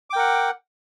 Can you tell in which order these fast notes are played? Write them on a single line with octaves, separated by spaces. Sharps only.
D6 G5 A#4 F#5